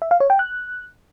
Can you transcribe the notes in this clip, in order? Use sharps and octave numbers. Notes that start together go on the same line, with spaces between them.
E5
F5
C#5
G5
F#6